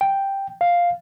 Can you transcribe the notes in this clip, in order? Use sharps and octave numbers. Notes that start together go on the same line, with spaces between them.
G5
F5